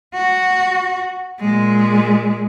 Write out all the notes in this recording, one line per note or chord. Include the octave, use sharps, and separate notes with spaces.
F#4
A#2 G#3